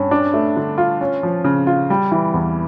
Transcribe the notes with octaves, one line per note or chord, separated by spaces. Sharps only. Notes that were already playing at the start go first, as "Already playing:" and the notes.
Already playing: G2 C#4
D4
A3
D3
F4
C#4
F3
C#3
F4
G3
E3
E2